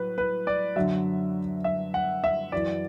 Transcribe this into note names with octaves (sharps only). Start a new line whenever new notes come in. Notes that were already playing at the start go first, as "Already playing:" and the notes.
Already playing: A2 F#3 B4
B4
D5
F#2 D3 F#3 E5
E5
F#5
E5
F#2 E3 D5